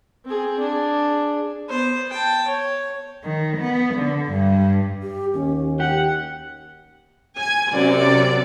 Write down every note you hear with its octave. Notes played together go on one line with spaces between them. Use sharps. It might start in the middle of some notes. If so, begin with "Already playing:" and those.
C4 G#4
D4 G#4
B3 C5
G5 A5
C#5
D#3
B3
D3
G2
G4
D#2 C#4
G4 F#5
G#5 G#6
F#2 C3 D5